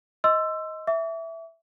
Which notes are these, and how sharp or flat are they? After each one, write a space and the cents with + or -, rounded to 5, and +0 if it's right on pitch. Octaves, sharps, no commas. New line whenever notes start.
D#5 +20 C6 +0 E6 +20
E5 +0 D6 -45